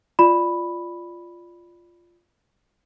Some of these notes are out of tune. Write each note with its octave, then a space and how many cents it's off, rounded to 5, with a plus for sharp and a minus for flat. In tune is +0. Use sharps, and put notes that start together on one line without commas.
F4 -5 D5 +10 B5 +0